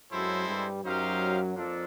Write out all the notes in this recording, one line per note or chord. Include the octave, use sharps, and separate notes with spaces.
F#2 F#3 G#3 C4 E4 A4 C5
G2 G3
F#2 F#3 D#4 G4 C5 F5
F2 F3 A#3 D4 F4 A4